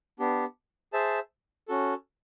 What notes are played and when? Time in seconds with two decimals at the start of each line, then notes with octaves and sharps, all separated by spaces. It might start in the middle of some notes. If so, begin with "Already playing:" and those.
0.19 B3 D4 G4
0.93 G#4 C5 E5 A5
1.68 C#4 F#4 A4